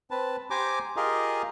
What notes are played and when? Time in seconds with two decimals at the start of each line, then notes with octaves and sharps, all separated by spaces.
0.11 C4 B4 A5
0.50 G4 C5 G#5 A#5 D6
0.96 F4 G4 G#4 A#4 D#5